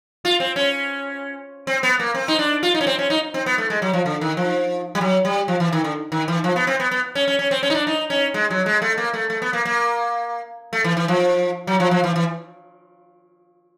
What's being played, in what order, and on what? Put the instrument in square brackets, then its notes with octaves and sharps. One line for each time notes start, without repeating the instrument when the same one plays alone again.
[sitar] F4
C4
C#4
C4
B3
A#3
C4
D#4
D4
F4
D#4
C#4
C4
C#4
D#4
C4
B3
A3
G#3
F#3
F3
D3
D#3
F3
G3
F#3
G3
F3
E3
D#3
D3
D#3
E3
F3
B3
C4
B3
B3
C#4
C#4
C#4
C4
C#4
D#4
D4
D#4
C#4
G#3
F#3
G#3
A3
A#3
A3
A3
B3
A#3
A#3
A3
E3
E3
F3
F#3
F3
F3
E3
E3